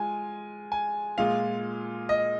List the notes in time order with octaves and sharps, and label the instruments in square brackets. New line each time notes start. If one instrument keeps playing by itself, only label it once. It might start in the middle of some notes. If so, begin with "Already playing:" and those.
Already playing: [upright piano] G#3 F4 [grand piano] G#5
[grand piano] G#5
[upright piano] A#2 G#3 F4 G#4 [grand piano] F5
[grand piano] D#5